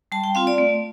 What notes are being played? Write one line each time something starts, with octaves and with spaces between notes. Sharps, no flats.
G3 A5
G5
C4 F4 F5
D5
A3